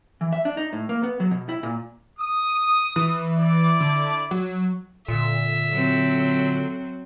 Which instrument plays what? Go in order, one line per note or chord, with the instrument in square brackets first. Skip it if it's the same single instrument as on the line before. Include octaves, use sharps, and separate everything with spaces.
[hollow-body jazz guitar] E3
E5
D4
D#4
A2
A#3
B3
F#3
B2
E4
A#2
[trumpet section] D#6
[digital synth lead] E3
[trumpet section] E4 D5 D6
[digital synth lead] D3
F#3
[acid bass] A#2 [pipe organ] D3 [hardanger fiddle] E5
[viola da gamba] F#3 C4